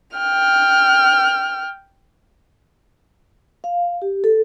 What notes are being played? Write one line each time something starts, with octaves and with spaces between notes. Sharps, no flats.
G5 F6
F5
G4
A4